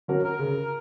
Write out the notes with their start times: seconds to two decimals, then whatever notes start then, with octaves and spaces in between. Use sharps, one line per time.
0.08 F#3 C#4 F#4 A#4
0.24 A#4
0.39 C#3